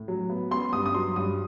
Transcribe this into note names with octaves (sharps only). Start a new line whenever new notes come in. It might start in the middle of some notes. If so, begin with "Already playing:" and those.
Already playing: A2
F#3
B3
B3 C6
G2 D#6
D#6
F#3 C6
G2 D#6